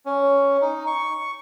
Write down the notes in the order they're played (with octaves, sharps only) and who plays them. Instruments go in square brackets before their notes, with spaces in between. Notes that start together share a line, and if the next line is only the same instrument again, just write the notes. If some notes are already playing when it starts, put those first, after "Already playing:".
[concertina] C#4
D#4
C#6